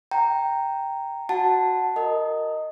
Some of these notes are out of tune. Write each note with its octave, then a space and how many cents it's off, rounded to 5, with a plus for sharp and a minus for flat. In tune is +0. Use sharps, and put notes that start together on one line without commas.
G5 +0 A#5 -5
F#4 +0 F#5 +0 A5 +0
A#4 -20 D#5 +0